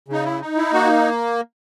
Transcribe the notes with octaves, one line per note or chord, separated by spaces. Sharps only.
C#3 D#4
E4
D#4
E4
A#3 F#4